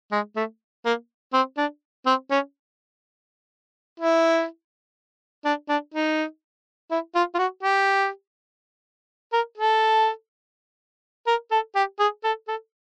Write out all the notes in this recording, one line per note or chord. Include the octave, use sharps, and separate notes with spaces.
G#3
A3
A#3
C4
D4
C4
C#4
E4
D4
D4
D#4
E4
F4
F4
F#4
G4
A#4
A4
A#4
A4
G4
G#4
A4
A4